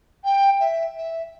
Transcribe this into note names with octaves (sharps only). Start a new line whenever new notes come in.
G5
E5
E5